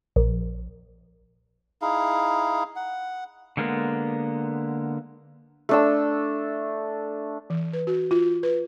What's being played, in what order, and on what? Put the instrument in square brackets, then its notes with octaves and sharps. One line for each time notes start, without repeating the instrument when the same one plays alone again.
[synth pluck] A#1
[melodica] D#4 E4 G#4 F5
F#5
[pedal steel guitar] D3 G#3 A#3 B3
[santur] A3 D4 E6
[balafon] E3
B4
F#4
F4
B4